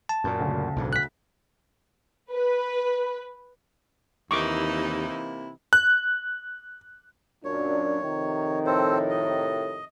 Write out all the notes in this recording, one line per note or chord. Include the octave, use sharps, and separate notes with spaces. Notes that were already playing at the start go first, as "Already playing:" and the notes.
A5
F#2 A#2
D2 C#3
B1 G#2 D3
F#6 B6
B4
D#2 C3 E3 A#3 D#4 E4 C#6 D6
F#6
F#2 A#2 D4 C#5
F2 C3 D#3
A2 C4 A4 C5
D#5